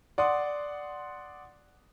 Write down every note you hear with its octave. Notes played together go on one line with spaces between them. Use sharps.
D5 F#5 C6 D#6